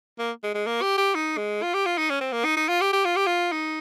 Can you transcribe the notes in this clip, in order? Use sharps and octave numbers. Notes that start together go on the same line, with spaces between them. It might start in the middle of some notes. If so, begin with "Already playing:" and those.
A#3
G#3
G#3
A#3
G4
G4
D#4
G#3
F4
G4
F4
D#4
C#4
C4
A#3
D#4
D#4
F4
G4
G4
F4
G4
F4
D#4